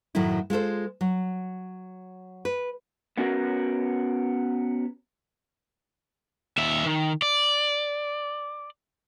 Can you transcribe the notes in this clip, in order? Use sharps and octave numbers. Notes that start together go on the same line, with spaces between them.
F#2 A2 D#3 F#3 A3 E4
G#3 F4 A4 C5
F#3
B4
B3 C#4 F#4 A#4 F#5
D#2 E5
D#3
D5